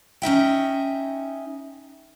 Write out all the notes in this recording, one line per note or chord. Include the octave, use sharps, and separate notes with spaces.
C#4 D#4 E5 G5